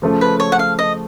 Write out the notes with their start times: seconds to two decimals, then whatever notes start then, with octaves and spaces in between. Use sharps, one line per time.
0.02 C#3 F3 A3
0.21 B4
0.40 C#5
0.52 F#5
0.59 F5
0.79 D#5